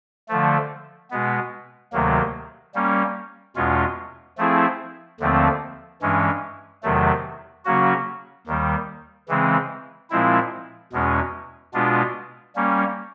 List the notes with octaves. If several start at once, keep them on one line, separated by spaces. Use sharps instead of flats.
D3 F3 A3
B2 G#3 B3
D2 C3 D#3 F#3 A#3
G3 A#3 C#4
E2 B2 G#3 C#4 F4
F3 A3 C4 E4 G#4
D#2 D3 F3 A3 C4
G2 E3 G#3 C#4
E2 C3 D#3 F#3 A3
C#3 F#3 A#3 C#4 F#4
D#2 D#3 G3
C#3 E3 G#3 C4
A#2 F3 G#3 C4 E4
E2 B2 G#3 C#4
B2 G#3 B3 D4 F4
G3 A#3 C#4